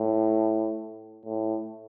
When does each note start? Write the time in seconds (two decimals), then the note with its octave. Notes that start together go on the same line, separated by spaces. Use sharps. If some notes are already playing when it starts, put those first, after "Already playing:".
Already playing: A2
1.26 A2